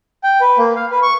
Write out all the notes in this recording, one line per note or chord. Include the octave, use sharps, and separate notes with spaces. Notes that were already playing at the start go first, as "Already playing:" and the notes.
G5
B4
A#3
F5
B4
C#6